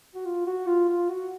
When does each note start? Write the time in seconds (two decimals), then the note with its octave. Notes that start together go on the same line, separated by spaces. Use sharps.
0.15 F#4
0.25 F4
0.46 F#4
0.67 F4
0.89 F4
1.09 F#4